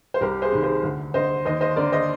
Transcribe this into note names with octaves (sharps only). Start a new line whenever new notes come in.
C5
C2 G4 A#4
G#4 C5
C3 D#3
G#4 C5
D2
D3 C5 D#5
D#2 C5 D#5
C5 D#5
D3 A#4 D5
C5 D#5